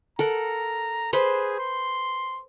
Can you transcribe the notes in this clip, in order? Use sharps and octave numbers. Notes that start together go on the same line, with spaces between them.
A4 A#4 F#5 A#5
G#4 B4 C5 B5
C6